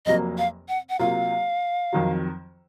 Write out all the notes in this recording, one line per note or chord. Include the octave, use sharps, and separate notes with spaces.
F1 F2 C3 F#3 A#3 D#5
F5
F#5
F#5
C3 F#3 A#3 F4 F5
F2 D#3 F#3